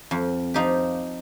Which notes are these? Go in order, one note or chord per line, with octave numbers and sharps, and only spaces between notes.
F2
F3 D#4 G4